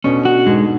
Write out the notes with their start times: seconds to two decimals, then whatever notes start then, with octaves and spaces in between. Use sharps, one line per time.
0.04 B2 D3 C#4
0.25 F#4
0.46 G#2 B2 G#3